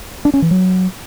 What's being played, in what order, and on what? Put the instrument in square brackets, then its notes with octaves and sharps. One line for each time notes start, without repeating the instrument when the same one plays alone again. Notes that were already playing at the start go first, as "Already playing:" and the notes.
[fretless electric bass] D4
C#4
E3
F#3